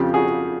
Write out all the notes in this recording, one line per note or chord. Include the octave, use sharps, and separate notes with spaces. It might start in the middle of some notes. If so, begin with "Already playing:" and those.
Already playing: F2 C#3 F3 F4 G4
F#4 G#4